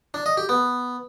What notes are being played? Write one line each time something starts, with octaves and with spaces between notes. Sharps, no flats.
D4
D#5
G4
B3